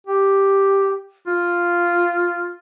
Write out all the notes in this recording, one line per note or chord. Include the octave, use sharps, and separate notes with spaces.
G4
F4